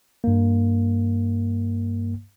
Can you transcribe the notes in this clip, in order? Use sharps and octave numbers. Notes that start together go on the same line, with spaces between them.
G2 A#3